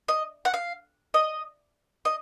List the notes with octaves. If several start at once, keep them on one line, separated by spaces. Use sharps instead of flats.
D#5
F#5
F5
D#5
D#5